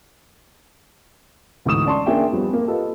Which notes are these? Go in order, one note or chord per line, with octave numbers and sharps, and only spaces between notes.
D2 G#2 E3 C#6 D#6 E7
C#4 D5 A5 C6 C#6
A#3 C#4 D4 G#4 E5 G5
F2 G3 B3 C4
A#3
F4 G4 A4 B4 D#5